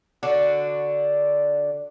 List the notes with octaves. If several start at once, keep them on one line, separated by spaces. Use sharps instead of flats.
D3 D4 F#4